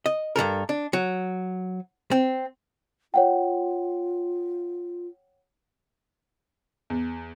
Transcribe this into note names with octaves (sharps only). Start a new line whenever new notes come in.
D#5
G2 B2 A4 A#4
D4
F#3
C4
F4 C#5 F#5 G5
E2